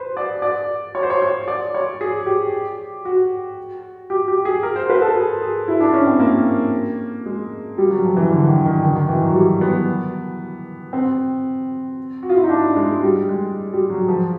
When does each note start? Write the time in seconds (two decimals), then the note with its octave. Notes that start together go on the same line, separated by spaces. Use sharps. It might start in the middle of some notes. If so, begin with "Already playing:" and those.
Already playing: B4 C5
0.17 D5
0.42 D5
0.95 C#5
1.03 C5
1.10 C#5
1.22 C#5
1.48 D5
1.75 C#5
2.01 G#4
2.26 G4
3.05 F#4
4.10 G4
4.28 G4
4.45 G#4
4.63 A#4
4.76 C5
4.90 B4
5.02 A4
5.16 G#4
5.42 G#4
5.68 E4
5.81 D4
5.93 C#4
6.07 C4
6.20 A#3
7.26 G#3
7.78 G3
7.91 F#3
8.04 F3
8.17 E3
8.31 D3
8.48 D#3
8.65 D#3
8.83 D#3
8.96 D#3
9.09 E3
9.22 F#3
9.35 G3
9.61 B3
10.93 C4
12.23 F#4
12.30 F4
12.36 E4
12.44 D#4
12.50 D4
12.76 G#3
13.03 G3
13.29 G#3
13.73 G3
13.90 F#3
14.08 F3